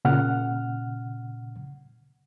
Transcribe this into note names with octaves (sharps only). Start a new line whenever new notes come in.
A#2 C#3 F#5 F6